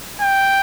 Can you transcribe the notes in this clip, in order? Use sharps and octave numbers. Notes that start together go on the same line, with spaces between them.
G5